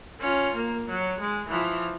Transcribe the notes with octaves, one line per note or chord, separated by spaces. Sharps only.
C#4 F4
A#3
F#3
G#3
E3 F3